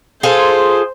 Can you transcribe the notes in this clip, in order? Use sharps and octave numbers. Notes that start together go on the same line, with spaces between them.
F4 G#4 A4 C5